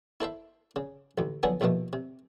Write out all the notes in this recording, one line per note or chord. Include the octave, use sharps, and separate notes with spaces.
E4 A4 C5 E5
C#3
A1 D2
D3 F3 F#3 B3 G#4 A4
A#1 D#2 B2 F3 A3
C3